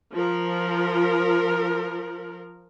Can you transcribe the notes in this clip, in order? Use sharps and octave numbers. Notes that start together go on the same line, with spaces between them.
F3 A#4